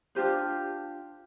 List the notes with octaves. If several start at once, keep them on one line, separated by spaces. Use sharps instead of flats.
D4 F4 G4 C5